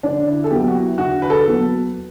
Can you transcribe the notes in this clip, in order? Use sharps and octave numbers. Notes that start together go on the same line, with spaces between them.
D3 D4
E4
A4
F#3 B3 G4
F#4
E4
D3 F#4
B4
A4
F#3 B3